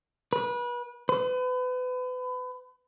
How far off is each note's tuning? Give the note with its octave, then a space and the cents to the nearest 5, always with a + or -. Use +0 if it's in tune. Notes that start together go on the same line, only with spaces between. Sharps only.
B4 -30
B4 +35